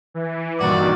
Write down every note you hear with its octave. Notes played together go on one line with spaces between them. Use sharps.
E3
G2 A#2 D#3 F#4 D5